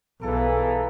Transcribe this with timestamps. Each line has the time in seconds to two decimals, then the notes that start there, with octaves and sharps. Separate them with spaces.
0.22 B1 E3 B3 G#4 A4 F5 A#5